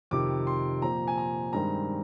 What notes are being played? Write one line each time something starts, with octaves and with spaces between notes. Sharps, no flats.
F2 C3 D#3 D6
C6
A#2 F3 C4 A#5
G#5
A#5
G2 D#3 G#3 C4 A#5